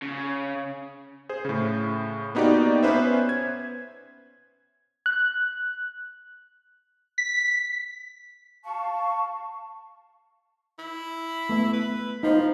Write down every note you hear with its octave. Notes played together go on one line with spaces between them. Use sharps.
C#3
G#4 C5
A2 C#3
A#3 B3 D#4 F#4 G4 D5
B3 C#4 B4 C5 E5
G#6
F#6
B6
F5 A5 C#6
E4
A3 B3 E5
B4
F3 D#4 C5